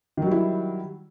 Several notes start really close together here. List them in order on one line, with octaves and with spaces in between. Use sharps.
D#3 F#3 G3 E4